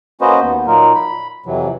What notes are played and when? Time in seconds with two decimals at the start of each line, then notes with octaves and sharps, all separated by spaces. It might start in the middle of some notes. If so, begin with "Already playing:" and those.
0.21 A#3 C#4 F#4 B4 C5 D#5
0.41 D#2 B3
0.67 A#2 F#3 A#3 D#4 F4 A#4
0.95 B5
1.46 F2 C3 E3 F#3